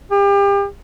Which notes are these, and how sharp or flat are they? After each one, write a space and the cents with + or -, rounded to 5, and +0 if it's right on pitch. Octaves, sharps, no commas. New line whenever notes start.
G4 +35